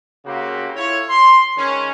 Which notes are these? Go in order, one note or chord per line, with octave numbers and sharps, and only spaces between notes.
C#3 A#3 C4 F#4 G4
E4 F4 A4 C#5
C6
D#3 G#3 C#4